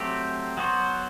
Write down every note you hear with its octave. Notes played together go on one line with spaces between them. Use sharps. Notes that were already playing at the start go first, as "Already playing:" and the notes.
Already playing: F#3 A3 C4 G4
F#3 B3 F#4 C5